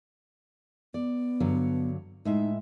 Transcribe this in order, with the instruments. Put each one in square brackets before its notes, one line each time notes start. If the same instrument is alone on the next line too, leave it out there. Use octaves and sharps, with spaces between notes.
[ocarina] B3 [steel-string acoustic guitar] D5
[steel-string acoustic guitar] G2 D3 F#3
[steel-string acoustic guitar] A2 G#3 E5 [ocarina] D#4